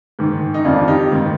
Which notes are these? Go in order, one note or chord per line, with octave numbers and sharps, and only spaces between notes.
G#2 D#3
D#4
F2 D#3 D4 F4
F4
D#4 G4
G#2 D#3